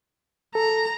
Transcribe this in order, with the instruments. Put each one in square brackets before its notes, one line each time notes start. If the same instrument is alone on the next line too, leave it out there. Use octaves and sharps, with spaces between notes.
[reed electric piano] A4 [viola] A#5